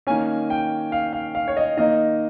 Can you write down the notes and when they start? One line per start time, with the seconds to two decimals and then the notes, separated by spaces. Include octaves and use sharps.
0.07 D#3 A#3 C#4 G#5
0.50 G5
0.92 F5
1.13 F5
1.35 F5
1.48 C#5
1.57 D#5
1.77 D#3 A#3 D#4 D#5